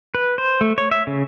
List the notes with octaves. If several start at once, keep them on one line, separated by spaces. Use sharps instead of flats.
B4
C5
A3
C#5
E5
C#3